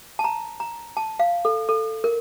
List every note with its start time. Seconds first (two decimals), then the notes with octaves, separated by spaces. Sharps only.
0.19 A5
0.24 A#5
0.60 A#5
0.97 A5
1.20 F5
1.45 A4
1.69 A4
2.04 A#4